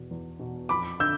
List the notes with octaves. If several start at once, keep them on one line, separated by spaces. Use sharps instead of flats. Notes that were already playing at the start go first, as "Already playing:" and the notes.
Already playing: E2 B2
E2
B2
F2 B5 D6
D3 E6 G6